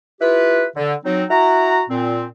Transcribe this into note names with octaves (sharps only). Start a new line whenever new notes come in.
E4 F4 G4 B4
D3
F#3 C4 D#4
E4 F#4 F#5 A#5
A#2 C4